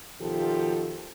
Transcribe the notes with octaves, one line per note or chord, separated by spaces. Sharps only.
B2 D#3 F3 F4 G4 A4